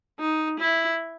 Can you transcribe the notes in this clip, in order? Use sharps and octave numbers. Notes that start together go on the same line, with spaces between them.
D#4
E4